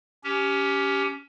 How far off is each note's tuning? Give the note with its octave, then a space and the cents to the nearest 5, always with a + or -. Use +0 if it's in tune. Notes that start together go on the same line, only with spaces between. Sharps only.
C#4 +20 G4 -5